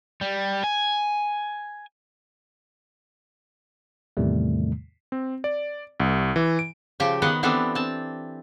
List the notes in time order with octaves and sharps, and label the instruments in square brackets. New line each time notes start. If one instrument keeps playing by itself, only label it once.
[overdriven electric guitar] G3
G#5
[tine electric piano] E2 A2 C3 D#3 G3 A3
[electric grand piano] C4
D5
C2
E3
D7
[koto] C#3 F3 G4
D#3 B3 D#5 F#5
E3 B3 C4 D4 G4 A4
C4 A5